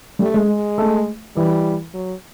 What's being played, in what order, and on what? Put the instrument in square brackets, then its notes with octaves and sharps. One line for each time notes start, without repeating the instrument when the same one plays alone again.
[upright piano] G3 [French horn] A3
[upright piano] G#3
[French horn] G#3
[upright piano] A3
[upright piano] E3 [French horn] G3
[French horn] F#3